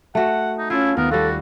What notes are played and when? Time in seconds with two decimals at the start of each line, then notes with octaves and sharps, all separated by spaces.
0.15 A3 F#4 F#5
0.58 D#4
0.70 C#4 E4 F4 A5
0.97 D#2 B3 A#4
1.11 G3 F4 F#4 A4